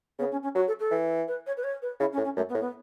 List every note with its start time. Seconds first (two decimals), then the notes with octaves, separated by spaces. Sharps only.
0.19 C#3 B3
0.31 C#4
0.43 C#4
0.55 F#3 F#4
0.67 A4
0.79 A4
0.91 E3
1.27 B4
1.46 C#5
1.57 B4
1.63 C#5
1.82 B4
2.00 C#3 E4
2.12 C#4
2.17 A2
2.24 C#4
2.36 F#2 A3
2.49 B3
2.54 A2
2.60 B3